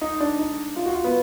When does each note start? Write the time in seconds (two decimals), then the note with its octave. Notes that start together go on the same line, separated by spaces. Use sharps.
0.01 D#4
0.20 D4
0.39 D#4
0.76 F4
0.86 F#4
0.95 F4
1.04 B3